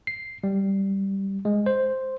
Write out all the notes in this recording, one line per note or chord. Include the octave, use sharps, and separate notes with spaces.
C7
G3
G#3
C5